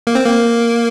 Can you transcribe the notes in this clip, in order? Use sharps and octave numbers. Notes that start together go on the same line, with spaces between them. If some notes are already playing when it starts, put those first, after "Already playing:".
A#3
C4
A#3